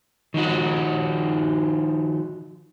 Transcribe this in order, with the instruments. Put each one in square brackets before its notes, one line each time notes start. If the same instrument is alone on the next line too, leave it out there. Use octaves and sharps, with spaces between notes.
[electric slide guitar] D#3 F3 D#4 F#4